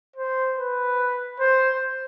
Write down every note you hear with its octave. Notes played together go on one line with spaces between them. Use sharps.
C5
B4
C5